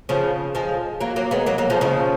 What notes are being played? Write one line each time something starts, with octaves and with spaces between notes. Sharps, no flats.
C#3 F3
F3 G#3
F#3 A#3
F#3 A#3
G#3 B3
F#3 A#3
F#3 A#3
F3 G#3
C#3 F3